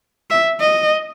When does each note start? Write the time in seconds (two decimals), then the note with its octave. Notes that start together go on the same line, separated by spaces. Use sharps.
0.30 E5
0.60 D#5